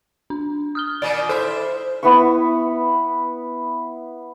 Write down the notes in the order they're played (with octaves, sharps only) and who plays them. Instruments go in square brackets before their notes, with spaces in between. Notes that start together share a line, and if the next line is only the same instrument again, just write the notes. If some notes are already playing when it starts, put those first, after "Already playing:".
[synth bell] D4
D#6 F6 G7
[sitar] A#2 D#3 [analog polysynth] D5
[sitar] E4 E5 [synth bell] A4 [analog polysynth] C5
[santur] B3 E4 B4 C#6